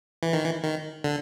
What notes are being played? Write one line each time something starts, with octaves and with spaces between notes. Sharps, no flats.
E3
D#3
E3
D#3
D3